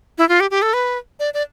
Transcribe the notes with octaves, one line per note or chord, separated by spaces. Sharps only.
E4
F4
G4
G4
A4
B4
D5
D5